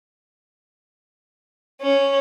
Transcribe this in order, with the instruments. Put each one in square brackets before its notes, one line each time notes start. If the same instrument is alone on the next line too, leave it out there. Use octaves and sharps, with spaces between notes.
[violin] C#4